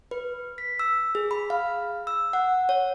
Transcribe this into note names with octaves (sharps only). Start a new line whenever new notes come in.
B4
B6
E6
G#4
B5
F5
E6
F#5
C#5